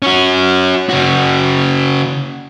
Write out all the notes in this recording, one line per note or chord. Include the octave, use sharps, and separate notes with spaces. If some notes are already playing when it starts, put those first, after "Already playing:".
C#4 F#4
C#3 F#4